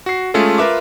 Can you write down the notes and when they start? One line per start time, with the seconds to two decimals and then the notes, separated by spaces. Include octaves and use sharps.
0.06 F#4 C7
0.34 G#3 A3 C#4 F4 G#4 A4
0.58 F4 A#4 B4 E5 D6